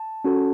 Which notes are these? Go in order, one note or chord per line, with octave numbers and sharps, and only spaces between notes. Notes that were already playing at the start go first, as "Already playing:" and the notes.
Already playing: A5
C#4 F#4 A4